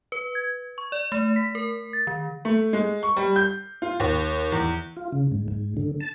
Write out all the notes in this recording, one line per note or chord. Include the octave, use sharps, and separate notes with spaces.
B4
G#6
C#6
D5
A3
B6
A#4
A6
D#3
A3
G#3
C#6
G3
G6
F4
D#2
E2
F4
C#3
G#2
G#2
D3
A5